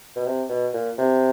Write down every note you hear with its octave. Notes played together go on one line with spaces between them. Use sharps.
B2
C3
B2
A#2
C3